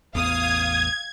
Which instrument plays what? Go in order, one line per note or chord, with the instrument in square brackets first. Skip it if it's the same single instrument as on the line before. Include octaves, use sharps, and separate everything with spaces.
[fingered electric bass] A1 E2 B3 [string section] F5 D#6 [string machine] G#6